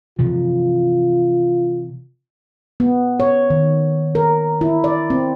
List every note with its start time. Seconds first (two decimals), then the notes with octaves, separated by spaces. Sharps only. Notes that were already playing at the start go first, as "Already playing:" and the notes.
0.19 C3 E3 F3 F4
2.80 B3
3.20 C#5
3.50 D#3
4.15 A#4
4.61 E4
4.84 D5
5.10 C4